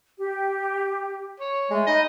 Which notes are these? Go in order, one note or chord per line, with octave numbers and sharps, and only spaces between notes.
G4
C#5
G#3 A3
D#4 D#5 B5